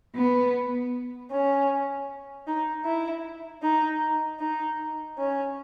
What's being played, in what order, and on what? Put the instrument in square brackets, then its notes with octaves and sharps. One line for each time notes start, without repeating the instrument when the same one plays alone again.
[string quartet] B3
C#4
D#4
E4
D#4
D#4
C#4